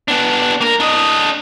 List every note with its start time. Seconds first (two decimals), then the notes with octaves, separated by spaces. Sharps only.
0.08 B3 D4
0.61 A#3 A#4
0.80 D4 D#5